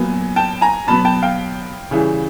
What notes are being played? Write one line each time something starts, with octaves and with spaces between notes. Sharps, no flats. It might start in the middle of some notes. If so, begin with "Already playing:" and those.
Already playing: A#2 F#3 B3 G#5
G5 A5
G#5 A#5
B2 F#3 B3 A5 B5
G5 A5
F5 G5
C#3 E3 G3